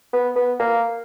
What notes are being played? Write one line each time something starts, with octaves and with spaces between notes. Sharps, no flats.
B3
B3
A#3